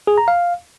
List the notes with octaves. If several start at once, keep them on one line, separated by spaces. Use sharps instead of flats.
G#4
A#5
F5